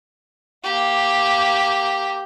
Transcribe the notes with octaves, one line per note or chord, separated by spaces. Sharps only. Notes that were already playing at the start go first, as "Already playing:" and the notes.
A#3 G4